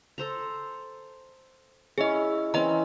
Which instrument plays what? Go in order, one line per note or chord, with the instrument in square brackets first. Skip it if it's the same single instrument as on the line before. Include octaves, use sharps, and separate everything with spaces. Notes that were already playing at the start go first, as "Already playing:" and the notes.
[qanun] A4 C5 A#5
[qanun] C#4 E4 [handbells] G#4 D#5
[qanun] E3 C4 C#4 [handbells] D#5 A#5